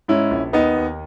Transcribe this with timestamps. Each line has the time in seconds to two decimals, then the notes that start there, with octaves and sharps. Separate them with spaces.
0.08 G#2 C#4 E4
0.31 A#1
0.53 D#2 B3 D#4
0.76 D#2